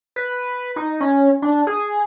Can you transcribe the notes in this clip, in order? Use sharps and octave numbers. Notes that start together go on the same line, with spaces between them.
B4
D#4
C#4
D4
G#4